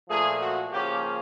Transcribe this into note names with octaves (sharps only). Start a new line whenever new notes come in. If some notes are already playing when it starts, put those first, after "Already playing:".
A#2 F3 A3 G#4
F#4
C#3 F3 A#3 C#4 G4